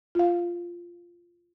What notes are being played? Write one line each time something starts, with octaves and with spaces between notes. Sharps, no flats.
F4 F5